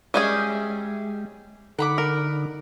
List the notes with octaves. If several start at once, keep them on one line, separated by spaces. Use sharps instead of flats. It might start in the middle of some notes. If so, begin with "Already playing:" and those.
G3 G#3 C#4 G#4 D#5 E5 G6
D3 D#4 F#5 B5 D6
A#4